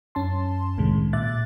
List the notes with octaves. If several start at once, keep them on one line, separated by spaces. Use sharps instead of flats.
F#2 C#4 A5 C6
C2 A2 C3 D#3 G#3
A#2 E5 D6 F#6 A6